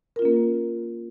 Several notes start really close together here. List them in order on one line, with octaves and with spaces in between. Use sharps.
A#4 F4 C#4 A#3